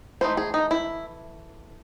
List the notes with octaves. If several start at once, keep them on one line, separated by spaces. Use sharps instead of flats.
E3 A3 D#4 C5
G#4
D#4
E4